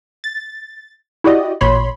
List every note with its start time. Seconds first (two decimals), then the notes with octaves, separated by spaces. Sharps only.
0.24 A6
1.24 E4 F#4 G4 D5 D#5
1.61 A1 A#2 C#5 B5 C6